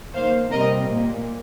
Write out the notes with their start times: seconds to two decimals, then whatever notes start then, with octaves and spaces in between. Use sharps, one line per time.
0.13 D#3 A#3 C5 F5
0.50 C3 G3 C4 A#4 D#5
0.88 A#2 A#3